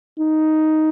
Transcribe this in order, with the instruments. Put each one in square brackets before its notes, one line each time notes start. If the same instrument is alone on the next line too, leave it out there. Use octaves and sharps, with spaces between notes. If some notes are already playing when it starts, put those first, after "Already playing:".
[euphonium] D#4